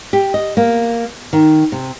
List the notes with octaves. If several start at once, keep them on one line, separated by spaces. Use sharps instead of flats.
G4
D#5
A#3
D#3
C3